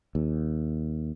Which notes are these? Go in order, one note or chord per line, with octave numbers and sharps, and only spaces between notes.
D#2